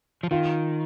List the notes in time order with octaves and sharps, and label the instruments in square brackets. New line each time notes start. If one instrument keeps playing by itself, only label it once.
[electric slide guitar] F3
[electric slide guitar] D#3 [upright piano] F4